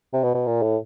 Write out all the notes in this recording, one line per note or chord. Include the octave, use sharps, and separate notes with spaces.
C3
B2
B2
A#2
A2